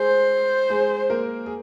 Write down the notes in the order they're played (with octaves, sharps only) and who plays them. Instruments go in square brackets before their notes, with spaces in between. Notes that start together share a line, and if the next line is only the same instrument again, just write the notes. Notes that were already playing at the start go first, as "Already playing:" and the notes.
Already playing: [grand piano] G#3 G#4 [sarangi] C5
[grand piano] G#3 G#4
A#3 A#4
G#4